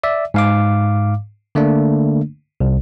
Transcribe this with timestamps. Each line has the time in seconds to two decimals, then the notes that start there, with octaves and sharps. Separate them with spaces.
0.04 D5 E5
0.34 G#2 F5 D6
1.55 D3 A3 A#3 D4
2.60 C2